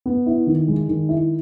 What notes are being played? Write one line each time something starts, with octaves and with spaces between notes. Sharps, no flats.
B3
E4
D#3
G#3
D#3
E4